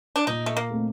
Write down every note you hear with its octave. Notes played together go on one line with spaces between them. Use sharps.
D4
A#2 D#4
A3
A#3
A3 C4 D#4